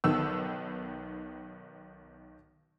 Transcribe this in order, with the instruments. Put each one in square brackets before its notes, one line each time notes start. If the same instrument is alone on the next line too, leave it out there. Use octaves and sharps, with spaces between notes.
[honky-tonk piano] B1 D#3 B3 E6